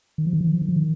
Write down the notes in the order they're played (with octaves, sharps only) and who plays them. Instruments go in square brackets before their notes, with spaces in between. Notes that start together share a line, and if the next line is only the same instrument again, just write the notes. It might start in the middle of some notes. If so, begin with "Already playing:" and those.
[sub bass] D#3
F3
D#3
F3
D#3
F3
D#3
F3
D#3